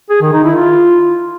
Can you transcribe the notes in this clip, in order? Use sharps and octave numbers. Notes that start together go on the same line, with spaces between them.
G#4
D#3
D#4
E4
F4